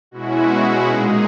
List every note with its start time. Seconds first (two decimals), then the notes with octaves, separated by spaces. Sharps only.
0.11 B2 G#3 C#4 E4 F#4
0.88 A#2 G#3 D#4 G#4